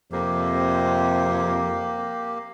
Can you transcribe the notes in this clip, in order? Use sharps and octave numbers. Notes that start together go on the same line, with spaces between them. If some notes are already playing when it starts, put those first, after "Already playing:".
F2 C3 A#3 G4